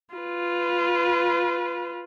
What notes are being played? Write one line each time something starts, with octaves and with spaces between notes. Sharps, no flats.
F4 B4